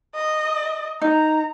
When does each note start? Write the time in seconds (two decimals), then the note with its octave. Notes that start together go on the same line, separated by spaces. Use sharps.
0.14 D#5
1.01 D#4 A#5